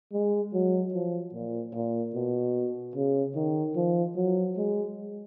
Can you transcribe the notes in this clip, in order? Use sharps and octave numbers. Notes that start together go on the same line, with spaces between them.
G#3
F#3
F3
A#2
A#2
B2
C#3
D#3
F3
F#3
G#3